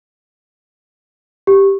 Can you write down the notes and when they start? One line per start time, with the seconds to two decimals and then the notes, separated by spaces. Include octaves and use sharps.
1.47 G4